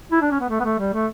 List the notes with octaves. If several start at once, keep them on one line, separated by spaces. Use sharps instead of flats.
E4
D4
C#4
B3
A3
B3
A3
G3
A3